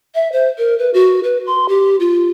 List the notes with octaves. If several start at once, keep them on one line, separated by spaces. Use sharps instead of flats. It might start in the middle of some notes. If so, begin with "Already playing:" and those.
E5
C5
A#4
B4
F#4
B4
C6
G4
F4